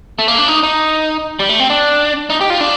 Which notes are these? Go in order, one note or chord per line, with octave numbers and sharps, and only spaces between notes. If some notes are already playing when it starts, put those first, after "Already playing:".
A3
A#3
D4
D#4
D#4
G3
A3
C4
D4
D#4
G4
F4
D4